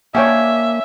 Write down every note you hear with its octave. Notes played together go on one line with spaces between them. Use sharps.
A#3 C#4 D4 C#5 E5 G5 G#5